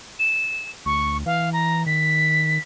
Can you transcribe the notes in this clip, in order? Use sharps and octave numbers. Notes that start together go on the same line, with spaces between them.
E7
D2 C#6
E3 F5
A#5
D#3 B6